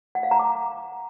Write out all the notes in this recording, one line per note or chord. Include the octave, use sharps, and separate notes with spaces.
F#5
F5
A#5
D6